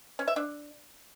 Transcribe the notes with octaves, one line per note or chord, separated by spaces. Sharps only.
C#4
E5
D4